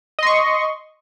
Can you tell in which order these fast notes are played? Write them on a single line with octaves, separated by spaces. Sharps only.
D#5 C6 C#6